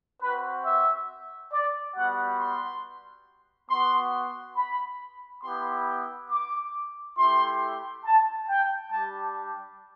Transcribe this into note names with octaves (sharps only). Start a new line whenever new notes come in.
C4 F#4 B4
E5
D5
G3 B3 F#4 F#5
C6
B3 F#4 C6
B5
B3 E4 G4 C6
D6
A3 E4 G4 C6
A5
G5
G3 D4 G4 A5